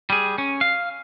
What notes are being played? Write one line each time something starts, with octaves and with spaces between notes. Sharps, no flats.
G3 G#4
C#4
F5